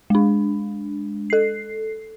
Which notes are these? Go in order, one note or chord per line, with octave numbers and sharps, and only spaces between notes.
G#3 D4
A4 C7